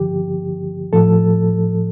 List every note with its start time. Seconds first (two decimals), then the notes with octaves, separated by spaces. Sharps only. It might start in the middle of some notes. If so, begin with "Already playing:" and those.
Already playing: G2 D3 F3 G4
0.93 A2 F3 A4